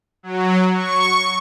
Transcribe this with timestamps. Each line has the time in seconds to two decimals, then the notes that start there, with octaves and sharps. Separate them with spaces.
0.23 F#3
0.76 C#6